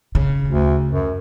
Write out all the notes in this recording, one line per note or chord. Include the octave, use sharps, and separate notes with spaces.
C#3
D2
F#2